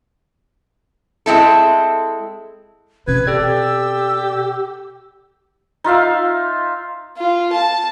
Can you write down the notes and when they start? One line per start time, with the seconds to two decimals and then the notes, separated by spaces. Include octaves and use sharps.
1.26 G#3 C4 E4 A4
3.08 B2 C4 B4 G#6
3.27 G4 A4 D5 E6
5.84 D#4 F4 E5 F5
7.17 F4
7.52 A5